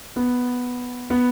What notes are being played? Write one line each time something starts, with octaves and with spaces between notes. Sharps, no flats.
B3
B3